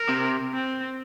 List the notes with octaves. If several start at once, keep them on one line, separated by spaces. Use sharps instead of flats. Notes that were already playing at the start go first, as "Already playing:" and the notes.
Already playing: A#4
C3
C4